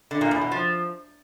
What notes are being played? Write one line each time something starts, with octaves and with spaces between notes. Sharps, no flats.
D3
A#2
E2
B2
F3